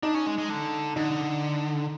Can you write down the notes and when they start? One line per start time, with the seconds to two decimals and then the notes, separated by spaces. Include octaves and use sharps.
0.03 D4 D#4
0.14 C#4
0.27 G#3
0.38 G#3
0.49 D3
0.96 D3 D#4